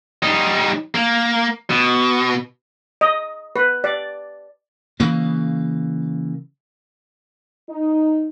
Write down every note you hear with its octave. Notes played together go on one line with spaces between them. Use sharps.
G3 D#4
A#3
B2
D#5
B4
D5
C#3 E3 A#3
D#4